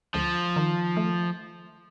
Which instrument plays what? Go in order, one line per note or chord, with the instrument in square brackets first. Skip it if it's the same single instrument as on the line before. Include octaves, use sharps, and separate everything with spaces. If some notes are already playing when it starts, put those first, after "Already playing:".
[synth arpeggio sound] D2 [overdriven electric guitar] F3
[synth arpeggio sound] D#3
A3